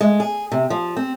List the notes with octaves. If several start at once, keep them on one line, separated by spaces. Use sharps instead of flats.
G#3
G#4
C3
F3
C4